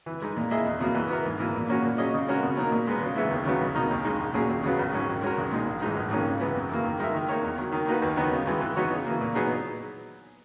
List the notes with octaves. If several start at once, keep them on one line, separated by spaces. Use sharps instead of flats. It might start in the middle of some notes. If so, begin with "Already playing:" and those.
E3
G#3 D#4
A#2
A#3 E4 G#4 D#5
E2
B2 F#3 A#3
E3
B3 E4 A#4
G#2
E3 A#3
A#2
A#3 C#4 F#4 A#4
A#2
F#3 C#4 G#4 D#5
C#3
G#3 C#4 F#4 A#4
B2
F#3 A#3 D#4 A#4
A#2
G#3 B3
C#3
E3 G#3 B3 E4
D#2
C#3 F#3 B3 D#4
B1
B2 A#3 D#4 A#4
D#2
C#3 G#3 D#4
A#1
A#2 F#3 C#4 G#4
D#2
C#3 F#3 B3
A#1
G#2 F#3 C#4
D#3
G#3 C#4 F#4 A#4
B1
A#2 G#3 D#4 G#4
A#1
G#2 E3 G#3 D#4
A#1
G#2 D#3 A#3 C#4
C#3
E3 G#3 B3
F#2
E3 A#3
D#3
G#3 D#4 A#4 E5
D#3
A#3 D#4 A#4 C#5
E2
D#3 F#3
D#3
A#3 D#4 F#4 B4
D#2
D#3 F#3 B3 D#4
C#3
E3 G#3 B3
E3
B3 D#4 F#4 C#5
C#3
E3 A#3
A#2
F#3 B3 D#4 G#4